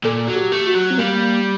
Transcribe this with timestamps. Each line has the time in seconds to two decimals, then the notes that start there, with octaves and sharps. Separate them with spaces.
0.04 A#2 A4
0.28 F#3
0.36 G4
0.52 A3
0.67 F#4
0.75 F#3
0.91 C4
0.98 G3 A#3